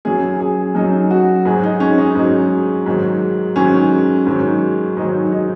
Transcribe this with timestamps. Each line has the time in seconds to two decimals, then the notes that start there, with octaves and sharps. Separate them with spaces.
0.05 F#2 F#3 G#4
0.40 G#4
0.75 F#2 F#3 D#4
1.11 F#4
1.45 G#2 F#3 G#4
1.64 D#4
1.80 C#4
1.98 D#4
2.15 G#2 F#3 D#4
2.86 G#2 D#3 F#3
3.56 G#2 D#3 F#3 C#4
4.26 G#2 D#3 F#3
4.97 G#2 D#3 F#3 D#4
5.32 D#4